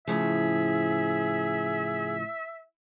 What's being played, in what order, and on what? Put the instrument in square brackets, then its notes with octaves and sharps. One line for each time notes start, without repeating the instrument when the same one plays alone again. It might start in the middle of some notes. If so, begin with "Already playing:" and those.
[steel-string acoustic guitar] A2 C#3 F3 [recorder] G#4 [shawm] E5